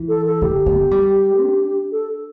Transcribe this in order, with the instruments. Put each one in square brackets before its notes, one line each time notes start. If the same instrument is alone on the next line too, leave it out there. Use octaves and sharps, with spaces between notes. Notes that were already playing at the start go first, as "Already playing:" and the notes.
Already playing: [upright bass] E3
[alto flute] A4
A4
[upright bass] D3 [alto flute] G4
[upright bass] B3
G3
D4
[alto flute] A4